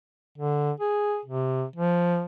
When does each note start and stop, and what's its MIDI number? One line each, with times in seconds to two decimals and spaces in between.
0.38 0.71 50
0.80 1.19 68
1.25 1.64 48
1.76 2.24 53